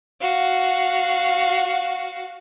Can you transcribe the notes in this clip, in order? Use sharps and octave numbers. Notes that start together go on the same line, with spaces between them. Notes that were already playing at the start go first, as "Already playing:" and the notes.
F#4 F5